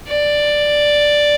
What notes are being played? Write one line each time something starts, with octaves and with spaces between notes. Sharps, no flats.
D5